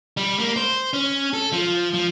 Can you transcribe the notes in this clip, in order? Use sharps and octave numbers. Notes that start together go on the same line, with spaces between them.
G3
A#3
C5
C#4
A4
F3
F3